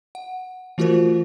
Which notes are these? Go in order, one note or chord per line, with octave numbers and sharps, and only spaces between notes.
F#5
E3 A3 F4 F#4 A#4 C5